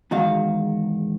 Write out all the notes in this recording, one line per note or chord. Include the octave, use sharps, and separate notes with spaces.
E2 G#2 D#3 F#4 F5